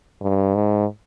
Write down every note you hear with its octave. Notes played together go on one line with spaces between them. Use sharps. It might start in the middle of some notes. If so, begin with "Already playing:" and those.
G2
G#2